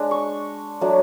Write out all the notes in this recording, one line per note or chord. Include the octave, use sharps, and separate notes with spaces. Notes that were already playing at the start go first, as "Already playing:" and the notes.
Already playing: G#3 D4
C#6
F#3 A3 D4